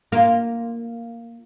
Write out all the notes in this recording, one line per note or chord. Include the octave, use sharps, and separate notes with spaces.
A#3 F4